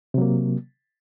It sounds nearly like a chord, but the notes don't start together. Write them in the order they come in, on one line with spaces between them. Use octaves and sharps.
C3 F#3 A#3